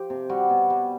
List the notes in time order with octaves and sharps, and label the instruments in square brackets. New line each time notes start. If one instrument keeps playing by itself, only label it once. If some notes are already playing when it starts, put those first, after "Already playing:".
Already playing: [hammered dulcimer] F3 G4
C3
G3 F#4
B2
G3